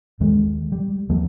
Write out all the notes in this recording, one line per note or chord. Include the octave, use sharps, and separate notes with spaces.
D#2 D#3 G#3
G3
D#2 F3 A#3